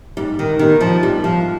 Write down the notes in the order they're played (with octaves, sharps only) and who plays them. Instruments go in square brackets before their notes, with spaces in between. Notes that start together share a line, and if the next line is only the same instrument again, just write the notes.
[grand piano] G#2 [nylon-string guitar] G3
[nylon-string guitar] D#3
[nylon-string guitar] D#3 [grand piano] G3 B3 D#4 G4
[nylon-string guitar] F3
[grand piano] G#2 [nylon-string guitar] G3
[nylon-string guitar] F3